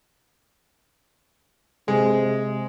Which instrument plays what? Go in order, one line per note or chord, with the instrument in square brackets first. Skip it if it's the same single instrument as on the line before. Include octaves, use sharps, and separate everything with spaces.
[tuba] C3 [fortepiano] G#3